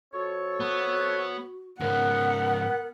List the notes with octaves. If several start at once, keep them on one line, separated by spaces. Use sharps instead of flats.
F2 F#4 A4 C#5
B3
G#2 C#3 B3 A#4 F#5